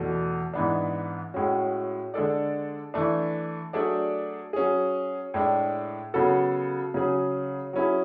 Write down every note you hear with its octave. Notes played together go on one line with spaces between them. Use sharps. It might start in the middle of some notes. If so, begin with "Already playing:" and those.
Already playing: E2 B2 A3
G#2 E3 B3 D4
A2 G#3 C#4 F#4
D3 G#3 D4 A4 D5
E3 A3 D4
F#3 A3 D4 G#4 D5
F#3 C#4 G#4
A2 G#3 D4
C#3 F#3 B3 F#4 A4
C#3 F#3 C#4 G#4
F#3 C#4 E4 G#4